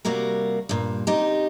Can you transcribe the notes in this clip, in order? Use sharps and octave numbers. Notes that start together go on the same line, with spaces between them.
C3 G3 A#3 F#4 A#4
G2 A#2
C3 D#4 G4